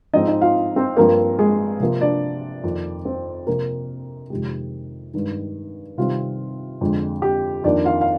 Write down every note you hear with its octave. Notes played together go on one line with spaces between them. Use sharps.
G#2 F3 G#3 C4 D#4 D#5
D#4 D#5
F4 F5
C4 C5
G2 F3 A#3 C4 A#4
G#3 G#4
C3 F3 A#3
D4 D5
F2 D#3 A#3
C4 C5
C3 F3 A#3 C4 A#4
F2 C3 D#3 G#3 G4
G2 D#3 G#3
C3 D#3 G3 C4 F4
F2 D3 G#3
G4
F2 D#3 A#3 D4 D5
F4 F5
F5